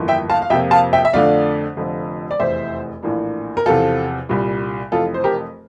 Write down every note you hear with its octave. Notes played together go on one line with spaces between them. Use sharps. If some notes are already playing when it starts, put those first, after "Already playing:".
Already playing: G1 F2 E3 A#3
E5 G5
F5 A5
F5
F2 C3 F3 A#3 E5 G5
F5 A5
E5 G5
E5
F2 D3 A3 D4 D5 F5
F1 F2 D3 F3
D5
F1 E2 E3 C5 E5
A#1 A2 E3 A#3 D4
A#4
E2 C3 F3 F4 A4
C2 A#2 G3
F1 F2 E3 F4 A4
C5
G4 A#4